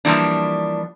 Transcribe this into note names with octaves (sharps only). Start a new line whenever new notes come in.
E3 F3 G3 A#3 D4